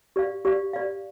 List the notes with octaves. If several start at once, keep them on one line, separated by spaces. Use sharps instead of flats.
G4 D5 F5
G4 D5 F5
G4 D5 F5